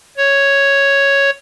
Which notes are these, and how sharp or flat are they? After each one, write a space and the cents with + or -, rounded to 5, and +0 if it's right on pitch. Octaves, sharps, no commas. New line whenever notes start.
C#5 +0